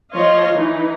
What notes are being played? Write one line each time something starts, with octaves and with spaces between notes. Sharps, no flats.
F3 F4 C#5 D#5 F5 C6
E3 D#4